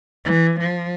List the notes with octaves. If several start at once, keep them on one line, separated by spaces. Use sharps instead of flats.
E3
F3